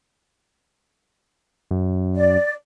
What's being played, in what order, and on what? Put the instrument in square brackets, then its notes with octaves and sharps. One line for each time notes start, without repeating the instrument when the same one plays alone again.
[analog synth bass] F#2
[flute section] D5